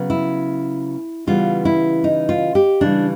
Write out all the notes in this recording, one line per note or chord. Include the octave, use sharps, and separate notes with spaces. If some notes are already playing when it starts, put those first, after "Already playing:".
Already playing: C#3 F#3 B3
E4
C#3 E3 G3 B3 F4
E4
D#4
F4
G4
C#3 E3 G3 D4